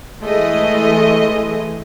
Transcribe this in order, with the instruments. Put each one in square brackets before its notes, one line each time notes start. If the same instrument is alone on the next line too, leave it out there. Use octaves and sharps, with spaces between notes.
[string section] E3 G#3 A3 D#5